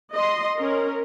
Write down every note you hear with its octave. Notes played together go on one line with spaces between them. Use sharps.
D#5 C6
C#4 A#4